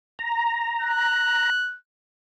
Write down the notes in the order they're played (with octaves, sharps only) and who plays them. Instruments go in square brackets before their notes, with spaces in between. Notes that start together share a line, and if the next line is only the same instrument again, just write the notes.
[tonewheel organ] A#5
[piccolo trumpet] F#6